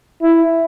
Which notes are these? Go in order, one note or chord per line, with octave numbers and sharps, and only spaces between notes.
E4